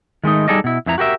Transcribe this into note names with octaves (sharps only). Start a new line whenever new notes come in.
D#3 G#3 A3 D#4
G3 D#4 G#4 A4 D5 D#5
B2 E4
F2 E3 E4 A#5
F#4 G4 A#4 E5